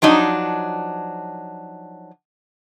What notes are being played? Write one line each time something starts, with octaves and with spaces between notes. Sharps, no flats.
F3 F#3 D4 D#4